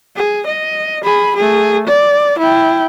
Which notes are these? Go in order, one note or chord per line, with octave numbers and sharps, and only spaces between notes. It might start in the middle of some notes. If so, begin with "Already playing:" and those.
G#4
D#5
G#4 B5
A3 G#4
D5
E4 G5